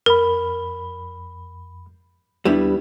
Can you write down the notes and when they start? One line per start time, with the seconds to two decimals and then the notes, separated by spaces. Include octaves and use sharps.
0.06 F2 A#4 B5
2.45 D#2 G3 B3 D4 E4